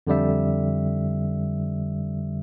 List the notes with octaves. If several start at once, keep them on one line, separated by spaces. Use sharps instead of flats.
F2 D3 G3 E5